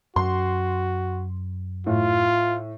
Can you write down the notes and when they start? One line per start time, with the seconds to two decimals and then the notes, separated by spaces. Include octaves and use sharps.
0.16 F#2 F#4 C6
1.86 A2 F4